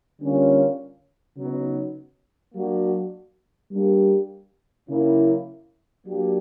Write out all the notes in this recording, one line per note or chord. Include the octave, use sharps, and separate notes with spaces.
D3 G3 A#3 C#4 F4
C#3 F#3 B3 D#4
F#3 A#3 D4 F#4
G3 A#3 D4 G4
C#3 F#3 A#3 C#4 E4
F#3 A#3 D4 G4